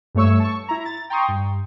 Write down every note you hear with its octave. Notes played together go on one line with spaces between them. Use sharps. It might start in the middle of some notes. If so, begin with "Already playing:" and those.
G2 G3 A3 C#5 C#6 E6
A5 C#6
E4 A#5
A6
G5 A#5 C6 C#6 D#6
G2